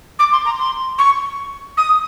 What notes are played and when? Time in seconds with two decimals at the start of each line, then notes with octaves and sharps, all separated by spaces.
0.19 D6
0.32 C6
0.45 A#5
0.59 C6
0.98 C#6
1.77 D#6